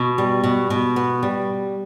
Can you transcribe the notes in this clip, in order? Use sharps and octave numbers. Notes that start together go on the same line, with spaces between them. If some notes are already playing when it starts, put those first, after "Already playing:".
Already playing: B2
G3
B2
B2
B3
G3